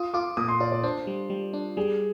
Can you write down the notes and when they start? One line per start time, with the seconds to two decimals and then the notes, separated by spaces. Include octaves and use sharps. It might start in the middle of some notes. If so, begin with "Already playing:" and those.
Already playing: F4 D#6
0.14 F4 D6
0.37 A#2 D#6
0.48 C6
0.60 F4 D5
0.72 D5
0.83 D4 C5
1.07 G3
1.30 G3
1.53 D4
1.77 G3 G#4